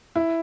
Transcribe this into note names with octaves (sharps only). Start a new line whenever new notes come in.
E4